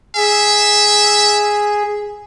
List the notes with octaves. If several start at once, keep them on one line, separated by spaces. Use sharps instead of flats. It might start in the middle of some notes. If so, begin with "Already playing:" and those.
G#4 E5